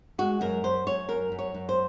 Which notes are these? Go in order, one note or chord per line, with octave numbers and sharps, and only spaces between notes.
G#3 F#4
F#2 A#4
F#2 C5
F#2 C#5
F#2 A#4
F#2
C#5
F#2
C5